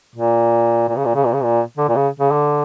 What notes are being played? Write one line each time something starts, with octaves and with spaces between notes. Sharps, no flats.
A#2
A#2
C#3
A#2
C#3
A#2
C#3
A#2
D3
A#2
C#3
C#3
D3